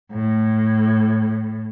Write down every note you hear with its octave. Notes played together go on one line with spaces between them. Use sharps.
A2